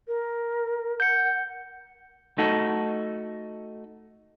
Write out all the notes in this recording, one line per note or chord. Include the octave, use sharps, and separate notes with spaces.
A#4
F#5 G6 C#7
A3 D#4 F#4 A4